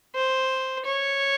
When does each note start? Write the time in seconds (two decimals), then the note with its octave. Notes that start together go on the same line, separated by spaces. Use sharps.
0.14 C5
0.85 C#5